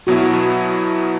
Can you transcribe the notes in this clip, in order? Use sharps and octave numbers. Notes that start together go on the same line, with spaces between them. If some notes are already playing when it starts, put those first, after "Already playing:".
B2 F#3 B3 E4 F#4